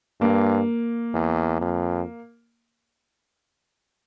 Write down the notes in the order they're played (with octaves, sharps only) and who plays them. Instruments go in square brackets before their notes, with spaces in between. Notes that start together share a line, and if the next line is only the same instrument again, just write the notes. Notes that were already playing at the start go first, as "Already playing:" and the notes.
[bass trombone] G2 [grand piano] A#3
[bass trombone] E2
F2